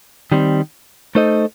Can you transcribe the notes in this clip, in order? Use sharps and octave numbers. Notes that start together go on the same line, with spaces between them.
D#3 G3 C4
A3 D#4 A4 C5 D#5